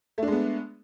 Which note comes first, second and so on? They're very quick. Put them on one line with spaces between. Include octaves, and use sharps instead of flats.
A3 D4 G#3 B3